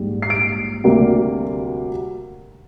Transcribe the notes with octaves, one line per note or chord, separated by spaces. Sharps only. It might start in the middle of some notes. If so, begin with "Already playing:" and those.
Already playing: A#1 G#2 G3
C7
D7
D2 C3 G3 A#3